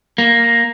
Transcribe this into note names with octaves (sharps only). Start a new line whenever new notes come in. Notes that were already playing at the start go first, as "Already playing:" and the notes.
A#3